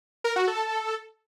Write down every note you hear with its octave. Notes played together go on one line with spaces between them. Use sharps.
A#4
F#4
A4